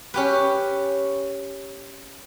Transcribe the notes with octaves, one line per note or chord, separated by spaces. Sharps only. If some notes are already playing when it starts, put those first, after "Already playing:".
C#4 G4 B4